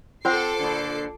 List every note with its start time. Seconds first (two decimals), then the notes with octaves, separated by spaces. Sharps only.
0.25 C4 F4 A4 C5 F#5 D6 C7
0.59 A#2 D3